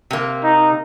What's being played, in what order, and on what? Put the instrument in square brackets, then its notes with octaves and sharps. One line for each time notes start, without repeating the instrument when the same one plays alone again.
[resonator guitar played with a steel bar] C3 A#3
[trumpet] D#4